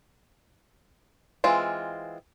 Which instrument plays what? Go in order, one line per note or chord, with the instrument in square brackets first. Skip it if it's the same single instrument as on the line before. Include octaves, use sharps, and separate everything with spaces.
[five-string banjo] E3 G#3 C4 F4